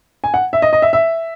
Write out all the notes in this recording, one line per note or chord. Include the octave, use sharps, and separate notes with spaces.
G#5
F#5
E5
D#5
D#5
E5
E5